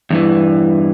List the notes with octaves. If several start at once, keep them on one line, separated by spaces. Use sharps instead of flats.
E2 G2 E3